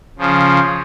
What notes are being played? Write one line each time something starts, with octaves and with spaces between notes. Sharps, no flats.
C#3 F3